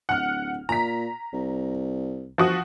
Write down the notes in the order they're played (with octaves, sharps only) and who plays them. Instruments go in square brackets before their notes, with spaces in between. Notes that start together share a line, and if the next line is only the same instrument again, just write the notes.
[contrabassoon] D1 [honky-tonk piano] F#5 F6
[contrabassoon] A#2 [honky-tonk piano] A#5 B6
[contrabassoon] C2
[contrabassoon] G1 [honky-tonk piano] F3 F#4 D#6